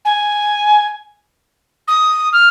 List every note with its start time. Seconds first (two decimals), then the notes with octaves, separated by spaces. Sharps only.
0.05 G#5
1.88 D#6
2.33 F6